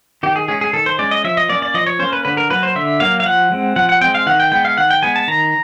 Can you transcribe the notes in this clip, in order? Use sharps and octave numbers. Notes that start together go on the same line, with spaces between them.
D#3 G4
G#4
G#3 C#4 G#4
G#4
D#3 A4
C5
G#3 C#4 D5
D#5
F3 E5
D#5
A#3 C#4 D5
D5
F3 D#5
C#5
A#3 C#4 C5
B4
D3 B4
A#4
F#3 A#3 B4
C5
D3 E5
F#3 A#3 F5
F5
F3 F#5
G#3 C4
F3 F#5
F#5
G#3 C4 G5
F5
D#3 F#5
G5
G#3 B3 G5
F5
D#3 F#5
G5
G#3 B3 G#5
A5
D#3 A#5